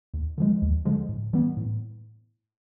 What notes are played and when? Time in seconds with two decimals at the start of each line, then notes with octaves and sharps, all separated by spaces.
0.14 D#2
0.38 D3 F3 G#3
0.62 D#2
0.85 D3 F3 G#3
1.09 A2
1.33 E3 G3 B3
1.57 A2